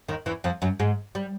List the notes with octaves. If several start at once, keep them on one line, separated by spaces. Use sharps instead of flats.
D#2 D#3
E2 E3
F2 F3
F#2 F#3
G#2 G#3
G3